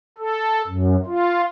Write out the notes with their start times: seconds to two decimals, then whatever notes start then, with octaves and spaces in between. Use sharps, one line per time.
0.18 A4
0.67 F#2
1.06 F4